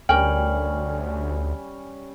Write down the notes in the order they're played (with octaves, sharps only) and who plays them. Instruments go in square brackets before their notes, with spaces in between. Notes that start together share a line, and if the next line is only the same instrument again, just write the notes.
[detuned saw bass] D2 [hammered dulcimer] G3 C#4 [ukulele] A#4 G5 [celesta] G#5 F6 F#7